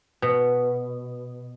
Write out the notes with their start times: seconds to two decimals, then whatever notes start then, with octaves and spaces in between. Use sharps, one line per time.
0.22 B2